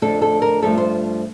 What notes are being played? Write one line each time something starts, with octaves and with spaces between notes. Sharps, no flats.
F2 D3 A3 A4
A4
A#4
G2 F3 A3 A4
C5